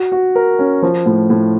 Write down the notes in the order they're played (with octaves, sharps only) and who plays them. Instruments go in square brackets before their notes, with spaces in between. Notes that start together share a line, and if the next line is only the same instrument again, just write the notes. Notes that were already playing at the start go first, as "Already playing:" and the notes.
Already playing: [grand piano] F#4
F#4
A#4
C#4
F3
A2
A2